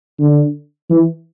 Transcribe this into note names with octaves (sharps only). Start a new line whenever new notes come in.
D3
E3